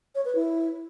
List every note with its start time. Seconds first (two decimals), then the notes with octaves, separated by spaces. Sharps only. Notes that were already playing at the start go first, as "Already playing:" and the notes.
0.15 C#5
0.25 B4
0.35 E4